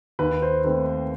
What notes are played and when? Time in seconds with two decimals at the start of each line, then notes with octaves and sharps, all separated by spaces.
0.19 D#2 B4
0.42 C5
0.64 D#3 A3 C4 B4
0.86 B4